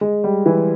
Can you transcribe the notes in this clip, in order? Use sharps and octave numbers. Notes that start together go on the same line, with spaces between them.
G#3
G3
E3